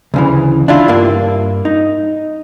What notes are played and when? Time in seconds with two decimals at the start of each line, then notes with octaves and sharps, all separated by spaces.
0.14 D2 C#3 E3
0.68 D4 E4 F4
0.88 G2 A#3
1.65 D#4